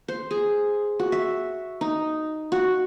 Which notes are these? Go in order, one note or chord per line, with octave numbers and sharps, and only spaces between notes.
C5
G#4
F#4
E5
D#4
F#4